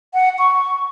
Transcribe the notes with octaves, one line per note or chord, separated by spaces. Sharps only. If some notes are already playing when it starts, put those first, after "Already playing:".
F#5
C#6